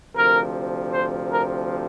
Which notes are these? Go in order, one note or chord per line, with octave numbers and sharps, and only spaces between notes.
D2 C3 F3 A#4
C5
A#4